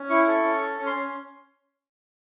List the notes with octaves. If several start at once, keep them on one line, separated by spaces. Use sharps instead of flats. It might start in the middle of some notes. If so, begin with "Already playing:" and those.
Already playing: C#4
E4 C#6
A4
C#4
A4
C#4
C6
C#4